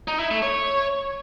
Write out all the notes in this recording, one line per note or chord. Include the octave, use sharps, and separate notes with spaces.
D#4
E4
A3
C#5